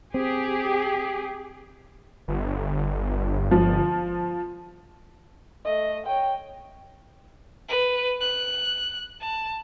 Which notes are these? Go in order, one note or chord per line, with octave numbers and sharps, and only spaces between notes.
C4 G4 G#4
G1
F3
A3 D#5
C#5 G5
B4
F#6
A5